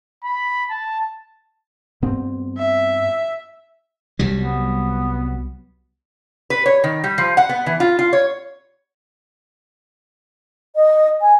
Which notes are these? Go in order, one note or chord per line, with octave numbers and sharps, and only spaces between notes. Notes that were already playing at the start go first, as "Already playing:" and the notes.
B5
A5
G2 B3 C4
E5
C2 F#3 G3
B3
B4
C#5
D#3
G3
F3
F#5
B3
E3
F4
F4
C#5
D#5
G#5